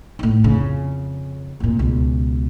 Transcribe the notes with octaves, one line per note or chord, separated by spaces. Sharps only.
D#2 A2
F2 C#3
F1 A#2
C#2 B2